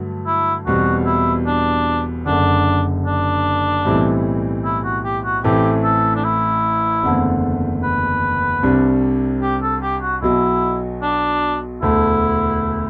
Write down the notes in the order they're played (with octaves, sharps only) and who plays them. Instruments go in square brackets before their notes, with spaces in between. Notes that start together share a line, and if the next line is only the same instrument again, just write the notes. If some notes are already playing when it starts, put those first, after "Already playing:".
Already playing: [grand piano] G2 D3 F#3 A3
[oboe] E4
[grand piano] E1 E2 B2 G3 C4 [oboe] F#4
[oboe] E4
D4
[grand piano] F#1 F#2 D3 [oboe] D4
[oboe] D4
[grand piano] B1 A2 E3 G3 C4
[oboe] E4
F#4
G4
F#4
[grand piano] A1 A2 E3 A3 C4 [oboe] G4
[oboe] A4
D4
E4
[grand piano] F#1 E2 D3 A3 C4
[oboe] B4
[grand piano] C2 C3 G3 D4
[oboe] G4
A4
G4
F#4
[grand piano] B1 B2 F#3 [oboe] E4
[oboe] D4
[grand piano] E1 D2 D3 A3 [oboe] E4